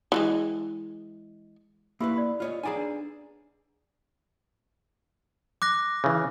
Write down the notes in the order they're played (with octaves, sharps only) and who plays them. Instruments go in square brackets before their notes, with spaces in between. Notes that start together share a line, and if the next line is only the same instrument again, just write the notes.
[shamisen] E3 F3 G#3
[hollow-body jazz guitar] A#3 E4 B4 [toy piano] G4 B5 E6
[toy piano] D5 B5
[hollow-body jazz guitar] F4 C#5 D#5
[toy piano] D#4 F#5 A#5 [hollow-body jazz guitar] G#4 D5 G#5
[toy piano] D4 B4
[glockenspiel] D6 F#6 A#6
[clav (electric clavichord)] C#3 E3